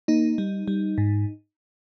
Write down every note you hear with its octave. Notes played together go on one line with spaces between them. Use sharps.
A#3 D#4
G3
G3
G#2